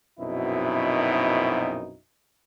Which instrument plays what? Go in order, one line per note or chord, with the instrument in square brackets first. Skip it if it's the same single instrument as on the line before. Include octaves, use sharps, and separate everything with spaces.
[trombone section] A#1 F#2 B2 C4 D#4 E4